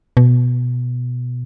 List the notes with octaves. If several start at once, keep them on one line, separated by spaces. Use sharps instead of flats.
B2